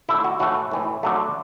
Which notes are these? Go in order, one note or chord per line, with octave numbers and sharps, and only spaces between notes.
D3 A3 E4
F#4
A2 E3 A3 F#4
A2 E3 A3
D3 F#3 A3